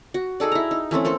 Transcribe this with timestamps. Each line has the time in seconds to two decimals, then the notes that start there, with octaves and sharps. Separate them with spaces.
0.14 F#4
0.40 D#4 G#4 A4 D5
0.52 E4 A#5
0.71 D#4
0.91 E3 A3 C4 C#4
1.05 A#3 A4 C5 C6